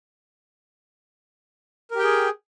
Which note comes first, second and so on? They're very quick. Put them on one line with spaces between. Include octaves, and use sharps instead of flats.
A#4 G4 G5 G#4